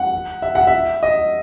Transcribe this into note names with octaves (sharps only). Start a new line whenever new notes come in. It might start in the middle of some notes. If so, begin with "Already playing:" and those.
Already playing: F#5
E5
F#5
E5
D#5